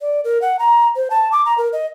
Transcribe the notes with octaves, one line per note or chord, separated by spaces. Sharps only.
D5
A#4
F#5
A#5
C5
A5
D6
A#5
A#4
D#5